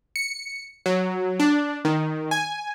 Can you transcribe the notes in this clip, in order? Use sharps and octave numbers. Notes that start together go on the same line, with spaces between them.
C#7
F#3
D4
D#3
G#5